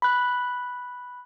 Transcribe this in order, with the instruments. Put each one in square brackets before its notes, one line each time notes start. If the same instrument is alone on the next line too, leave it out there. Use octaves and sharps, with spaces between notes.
[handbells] B5 F#6